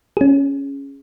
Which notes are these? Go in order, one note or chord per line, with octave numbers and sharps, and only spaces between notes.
C#4 G#4